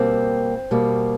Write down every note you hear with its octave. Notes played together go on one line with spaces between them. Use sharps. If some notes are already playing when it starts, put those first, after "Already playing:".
Already playing: B2 G3 A#3 C4
B2 G3 A#3